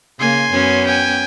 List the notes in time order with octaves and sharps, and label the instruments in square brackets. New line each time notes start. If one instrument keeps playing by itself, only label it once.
[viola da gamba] C#3 A#3 [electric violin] G#5 C6
[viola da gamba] F#2 B3 C#4
[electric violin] G5 G#5